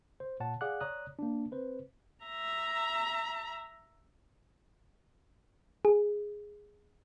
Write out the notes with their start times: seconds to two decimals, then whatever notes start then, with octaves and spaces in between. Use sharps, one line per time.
0.20 C5
0.40 A#2 C#5 F#5 A5
0.61 G#4 D5 F5 F#5 D6 F#6
0.80 C#5 D5 A#5 D#6 F#6
1.19 A#3 D4
1.51 C4 B4 C5
2.25 E5 A#5
5.85 G#4